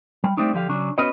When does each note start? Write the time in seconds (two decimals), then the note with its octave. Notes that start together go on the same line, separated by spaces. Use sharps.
0.24 G3
0.37 G3 A3 C4 D4 D#4
0.53 D3 F3 G4 F5
0.69 C#3 F#3 D4
0.98 B3 C#4 F#4 B4 D#5